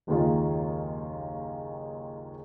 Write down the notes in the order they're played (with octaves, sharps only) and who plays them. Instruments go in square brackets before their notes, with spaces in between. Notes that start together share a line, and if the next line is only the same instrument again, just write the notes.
[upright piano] F#1 D#2 D#3 G#3 F4